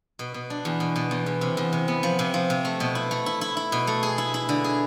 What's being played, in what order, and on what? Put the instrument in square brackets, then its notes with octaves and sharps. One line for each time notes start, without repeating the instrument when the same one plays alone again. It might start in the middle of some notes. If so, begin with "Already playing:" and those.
[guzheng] B2
B2
D4
E2
B2
B2
E2
E2
C3
E2
C3
B3
F3
C3
F3
C3
A3
B2
E4
A3
E4
E4
E4
B2
A3
G#4
E4
E4
D3
G#4